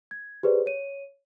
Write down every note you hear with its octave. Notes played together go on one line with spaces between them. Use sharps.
G#6
G4 G#4 B4 C5 D5
C#5 D#7